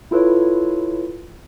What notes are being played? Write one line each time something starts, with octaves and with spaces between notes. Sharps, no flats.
E4 F4 A4 B4 C#5